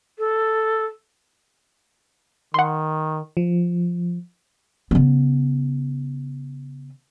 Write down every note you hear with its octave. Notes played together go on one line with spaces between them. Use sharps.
A4
D#3 F#5 C6
F3
C#3 B3